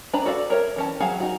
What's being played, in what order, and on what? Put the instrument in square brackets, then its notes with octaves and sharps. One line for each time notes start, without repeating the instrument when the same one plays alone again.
[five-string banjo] D4 B4 D5 A5 A#5
F#4 A4 D5 F5
A#4 C#5 E5
E3 C#4 A5
F#3 G#4 F5 F#5 G#5
D#4 F#4